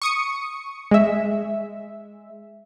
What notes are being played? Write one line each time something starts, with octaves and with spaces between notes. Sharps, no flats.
C#6 D#6 C#7
G#3 E5